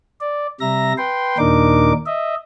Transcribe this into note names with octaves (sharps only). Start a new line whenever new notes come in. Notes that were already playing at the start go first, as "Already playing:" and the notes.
D5
C3 G3 E5 A#5 A#6
B4 G5 C6
D#2 A#2 D4 D#4 A#4 D6
D#5 E5